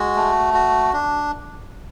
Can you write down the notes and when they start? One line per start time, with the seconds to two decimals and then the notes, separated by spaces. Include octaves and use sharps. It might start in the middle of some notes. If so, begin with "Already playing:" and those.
Already playing: G#3 F#4
0.15 A3
0.54 F#4
0.93 D4